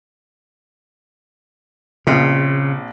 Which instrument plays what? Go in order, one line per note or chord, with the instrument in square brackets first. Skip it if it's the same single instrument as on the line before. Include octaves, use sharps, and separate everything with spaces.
[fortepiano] A#1 C4 [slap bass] C#3